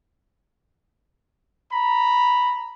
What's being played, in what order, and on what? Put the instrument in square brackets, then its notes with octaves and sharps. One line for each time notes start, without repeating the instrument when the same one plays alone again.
[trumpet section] A#5 B5